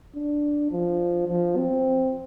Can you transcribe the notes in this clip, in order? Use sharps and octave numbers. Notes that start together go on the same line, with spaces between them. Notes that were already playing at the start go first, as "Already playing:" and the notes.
D4
F3
F3
C4